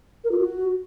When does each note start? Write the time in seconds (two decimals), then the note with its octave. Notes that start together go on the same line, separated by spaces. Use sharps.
0.24 A#4
0.32 F4
0.39 F#4